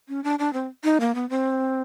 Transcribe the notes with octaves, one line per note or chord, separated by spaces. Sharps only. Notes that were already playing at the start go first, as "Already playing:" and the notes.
C#4
D4
D4
C4
D#4
A#3
B3
C4